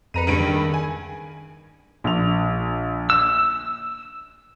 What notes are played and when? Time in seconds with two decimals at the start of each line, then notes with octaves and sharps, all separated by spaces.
0.14 F2 B4 A#5 C#7 D#7
0.27 C#2 G2 D7
0.40 D#3
0.74 G#5
2.04 A#1 F7
3.10 E6 E7